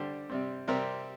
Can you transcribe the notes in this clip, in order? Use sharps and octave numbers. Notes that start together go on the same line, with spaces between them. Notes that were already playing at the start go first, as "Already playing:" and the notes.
Already playing: D3 G3 D4 G4 C5
C3 G3 C4
C3 G3 C4 G4 A#4